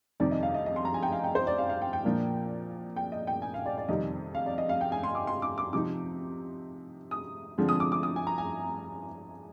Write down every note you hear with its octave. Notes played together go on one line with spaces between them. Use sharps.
F2 C3 D#3 G3 D5
D#5
F5
D#5
D#5
C6
A#5
G#5
G5
F5
G5
C5
D5
F5
F5
G5
G5
A#2 F3 A#3 D4
G5
D#5
G5
G#5
F5
D5
D5
F2 C3 D#3 G3 D#5
F5
D5
D#5
F5
G5
G#5
C6
D6
C6
D6
D6
C3 F3 C4 D#4 D6
D#6
D3 F3 G#3 C4
D#6
D6
D6
D#6
G#5
A#5
G#5